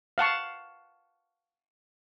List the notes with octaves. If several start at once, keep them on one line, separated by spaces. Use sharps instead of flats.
F5 F#5 A5 C#6